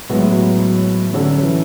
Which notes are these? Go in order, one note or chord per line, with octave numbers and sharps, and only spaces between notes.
A2 F#3 G#3 B3 F#4
E3
D3 F#3 C#4 F#4 A4
E3